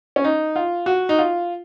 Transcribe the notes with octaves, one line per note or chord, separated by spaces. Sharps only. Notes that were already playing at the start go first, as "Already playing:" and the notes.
C#4
D#4
F4
F#4
D#4
F4